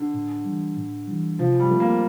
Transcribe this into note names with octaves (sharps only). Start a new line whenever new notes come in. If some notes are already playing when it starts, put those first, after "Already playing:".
Already playing: D3
A2
E3 G3
A2
E3 G3
C3 F3
G3
F3 A3 C4
A#3